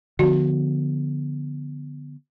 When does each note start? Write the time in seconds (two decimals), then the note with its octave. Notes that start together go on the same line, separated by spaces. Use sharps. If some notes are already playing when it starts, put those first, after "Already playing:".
0.19 D3 F3 B3 F#4